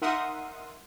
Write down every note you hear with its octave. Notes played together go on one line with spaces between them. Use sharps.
D#4 A#4 E5 F#5 C6 D#6